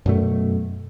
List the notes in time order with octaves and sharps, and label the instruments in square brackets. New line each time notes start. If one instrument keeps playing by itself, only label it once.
[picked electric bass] F#2 B2 A3